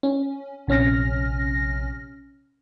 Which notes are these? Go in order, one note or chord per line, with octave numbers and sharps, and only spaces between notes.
C#4
A#1 C3 C#4 F6 A#6